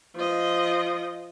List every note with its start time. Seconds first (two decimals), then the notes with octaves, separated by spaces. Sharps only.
0.15 F3 D#5